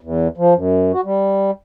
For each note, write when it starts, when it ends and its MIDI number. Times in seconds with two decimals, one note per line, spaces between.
0.01 0.28 40
0.38 0.54 53
0.55 0.92 42
0.93 1.01 66
1.05 1.51 55